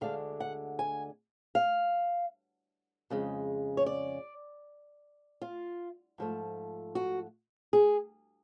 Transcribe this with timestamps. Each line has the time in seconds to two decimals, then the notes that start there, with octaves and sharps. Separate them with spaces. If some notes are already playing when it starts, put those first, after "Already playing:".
0.01 D2 D3 G#3 D4 F5
0.40 F#5
0.79 G#5
1.55 F5
3.10 F2 C#3 G#3
3.77 C#5
3.86 D5
5.42 F4
6.18 G#2 F3 A3
6.95 F#4
7.73 G#4